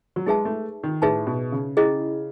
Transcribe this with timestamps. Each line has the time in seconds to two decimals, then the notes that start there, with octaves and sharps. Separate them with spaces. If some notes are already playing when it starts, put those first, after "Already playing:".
0.16 F#3
0.26 G#3 D#4 G#4 B4 E5 A5
0.45 A3
0.84 D#3
1.02 A2 D#4 G#4 B4 E5 A5
1.27 B2
1.52 C#3
1.77 C#4 E4 G#4 D#5